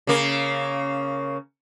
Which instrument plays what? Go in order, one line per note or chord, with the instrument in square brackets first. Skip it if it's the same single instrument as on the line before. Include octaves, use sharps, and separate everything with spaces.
[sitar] C#3 A#3